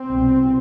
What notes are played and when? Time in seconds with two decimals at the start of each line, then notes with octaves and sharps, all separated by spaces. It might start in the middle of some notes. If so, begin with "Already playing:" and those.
Already playing: C4
0.09 C2 B2